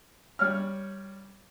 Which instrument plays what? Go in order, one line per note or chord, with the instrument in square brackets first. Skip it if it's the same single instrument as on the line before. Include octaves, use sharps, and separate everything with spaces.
[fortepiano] G3 C#5 F6